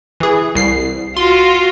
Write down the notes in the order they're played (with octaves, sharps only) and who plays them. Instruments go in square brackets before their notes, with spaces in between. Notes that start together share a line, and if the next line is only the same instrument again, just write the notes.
[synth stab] E3 G#4
C2 C7
[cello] F4 F#4 [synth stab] C6